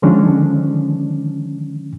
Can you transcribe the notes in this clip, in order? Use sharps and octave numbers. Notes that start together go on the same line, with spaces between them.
D3 D#3 F3 G#3 C#4 D4